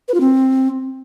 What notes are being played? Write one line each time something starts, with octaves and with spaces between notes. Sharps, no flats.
B4
F4
C4